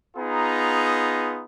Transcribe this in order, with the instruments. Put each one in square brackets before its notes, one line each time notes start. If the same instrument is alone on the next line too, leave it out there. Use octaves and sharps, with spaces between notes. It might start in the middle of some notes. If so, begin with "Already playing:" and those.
[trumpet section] B3 D#4 F4 G#4 A#5